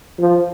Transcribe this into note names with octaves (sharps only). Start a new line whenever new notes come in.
F3